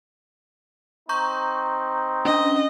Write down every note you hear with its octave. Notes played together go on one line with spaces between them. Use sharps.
C4 D#4 A#5 C#6 G6
C#4 D4 D#5